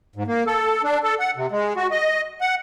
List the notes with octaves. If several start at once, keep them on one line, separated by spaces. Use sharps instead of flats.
G#2
A#3
A4
D4
A4
F#5
C3
G#3
F#4
D#5
F#5